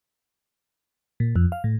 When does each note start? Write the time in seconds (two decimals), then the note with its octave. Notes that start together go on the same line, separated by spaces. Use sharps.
1.20 A#2
1.36 F2
1.52 F5
1.64 A2